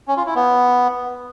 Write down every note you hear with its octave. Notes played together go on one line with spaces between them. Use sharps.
C#4
F4
E4
B3